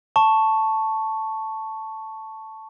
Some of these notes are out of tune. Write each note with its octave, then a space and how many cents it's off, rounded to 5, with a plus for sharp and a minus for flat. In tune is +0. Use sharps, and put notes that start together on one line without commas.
A5 +0 C#6 +0